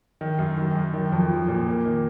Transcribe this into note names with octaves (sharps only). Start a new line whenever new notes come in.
D#3
F#2
D#3
F#2
D#3
F2
F3
A#2
A#3
D#3